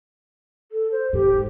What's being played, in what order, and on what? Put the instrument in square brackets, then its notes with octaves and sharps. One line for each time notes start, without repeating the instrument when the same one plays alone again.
[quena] A4
C5
[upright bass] G#2 [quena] G4